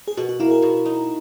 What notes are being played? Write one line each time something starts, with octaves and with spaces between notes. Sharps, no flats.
G#4
B2 F#4
F#4
A#3 E4
G#4
B2
D#4